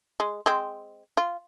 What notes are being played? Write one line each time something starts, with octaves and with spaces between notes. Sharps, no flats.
G#3
G#3 C4
F4